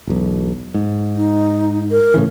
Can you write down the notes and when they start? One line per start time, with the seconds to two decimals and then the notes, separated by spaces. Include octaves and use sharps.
0.07 E1 B1
0.74 G#2
1.16 D#4
1.91 A#4
2.14 A2 C#3 E3